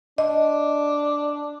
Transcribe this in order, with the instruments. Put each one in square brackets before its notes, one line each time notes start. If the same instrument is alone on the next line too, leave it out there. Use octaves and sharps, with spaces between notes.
[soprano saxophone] D4 [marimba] D#5